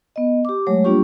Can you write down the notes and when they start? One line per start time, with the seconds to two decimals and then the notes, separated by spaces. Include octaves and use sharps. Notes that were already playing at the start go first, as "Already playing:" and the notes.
0.16 B3 D#5
0.45 G4 D6
0.67 F#3 G#3 A3 C#5
0.84 G3 A#3 D4 F4 G4 C#6